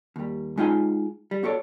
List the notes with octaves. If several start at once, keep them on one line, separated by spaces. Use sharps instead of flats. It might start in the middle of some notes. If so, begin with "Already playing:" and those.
D#2 G3
G#3 D#4 F4 G5 G#5
G3
B3 F#4 A4 C#5 D5